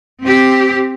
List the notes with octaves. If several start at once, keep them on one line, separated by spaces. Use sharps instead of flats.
C4 G4